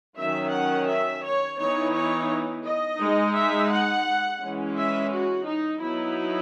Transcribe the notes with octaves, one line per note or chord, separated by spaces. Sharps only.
D#3 F#3 C#4 E5
F#5
E5
C#5
E3 B3 D#4 C#5
C#5
D#5
G#3 D#4
E5
F#5
E3 G#3 C#4
E5
F#4
D#4
F#3 B3 D#4 E4